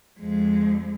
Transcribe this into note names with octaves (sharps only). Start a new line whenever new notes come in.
F2 G#3